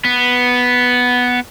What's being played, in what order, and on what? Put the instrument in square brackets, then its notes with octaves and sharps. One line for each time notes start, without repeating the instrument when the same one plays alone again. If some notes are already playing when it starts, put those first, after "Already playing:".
[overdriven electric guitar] B3